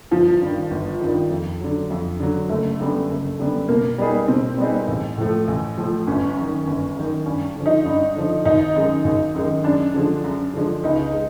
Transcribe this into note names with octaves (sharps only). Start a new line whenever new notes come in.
G1 F3
G2 D#3
G1
G2 D#3
F2
D3 F#3
F2
D3 F#3
F#1 A3
F#2 D3 G3 B3
F#1
F#2 D3 G3 B3
B2 A#3
G3 B3 D#4 G#4
B2 C4
G3 B3 D#4 G#4
A1
A2 F3 A3
A1
A2 F3 A3
G1 C#4
F#2 D#3
G1
F#2 D#3
G2 C#4
D3 F3
D#4
G2
D3 F3
G#1 D#4
F#2 D#3 G#3
G#1
F#2 D#3 G#3
F#2 D4
D3 F3 G#3
F#2
D3 F3 G#3
C#2 D#4
G#3